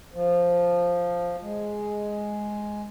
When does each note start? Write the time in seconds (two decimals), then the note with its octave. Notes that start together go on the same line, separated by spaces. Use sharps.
0.14 F3
1.42 G#3